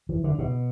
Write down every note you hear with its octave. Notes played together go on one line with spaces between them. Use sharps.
E3
D3
B2